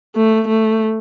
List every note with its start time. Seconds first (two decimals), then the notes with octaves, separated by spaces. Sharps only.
0.16 A3
0.48 A3